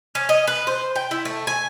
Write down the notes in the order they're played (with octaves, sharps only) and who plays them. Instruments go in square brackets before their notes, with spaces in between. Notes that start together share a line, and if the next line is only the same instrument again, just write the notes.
[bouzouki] C#4
D#5
B4
C5
G5
E4
A3
G#5